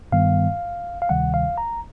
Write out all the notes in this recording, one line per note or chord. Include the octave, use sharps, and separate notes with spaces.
G2 D#3 G3 B3 F5
F5
D2 C3 D#3 G3 F#5
F5
A#5